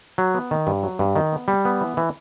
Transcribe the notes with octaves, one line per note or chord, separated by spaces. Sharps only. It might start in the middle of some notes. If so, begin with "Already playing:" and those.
F#3
B3
D#3
G2
F#3
G2
D#3
B3
G3
B3
E3
E3